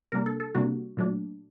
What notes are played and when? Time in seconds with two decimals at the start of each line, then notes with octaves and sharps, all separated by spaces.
0.12 C3 G3 A#3 D4 A#4
0.26 A4
0.40 A4
0.55 C3 G3 A#3 D4 F#4
0.97 A#2 F#3 A3 D4